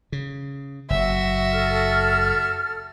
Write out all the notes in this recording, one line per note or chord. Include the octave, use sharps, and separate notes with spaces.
C#3
F#1 F#4 E5
A4 F6